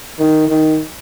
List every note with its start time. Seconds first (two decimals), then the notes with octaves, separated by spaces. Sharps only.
0.19 D#3
0.48 D#3